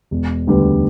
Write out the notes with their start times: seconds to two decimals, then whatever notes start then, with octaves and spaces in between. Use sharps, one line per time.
0.11 E1
0.47 D2 D3 G3 B3